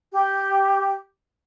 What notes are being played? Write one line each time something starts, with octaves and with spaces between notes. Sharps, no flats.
G4